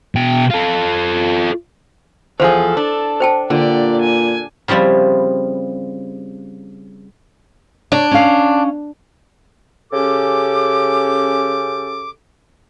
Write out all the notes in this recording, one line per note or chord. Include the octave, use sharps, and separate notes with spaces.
B2 G5
F4 A4
E2 F3 G#4 A4 C5
D4
C5 G5 A5
A#2 D3 G4 D5
G#5
C#3 F3 G3 C4 E4
D4 C#5
C#4 F5
C#3 C#4 G4 A4 D6